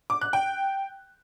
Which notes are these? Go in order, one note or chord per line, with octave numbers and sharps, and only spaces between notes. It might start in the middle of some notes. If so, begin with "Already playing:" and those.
D6
F#6
G5